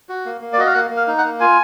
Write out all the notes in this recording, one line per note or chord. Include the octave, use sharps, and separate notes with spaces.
F#4
A#3
A#3
D5
F#4 D#5
F5
A#3 F#5
A#3
F5
D#4
F#5
A#3
F4 G#5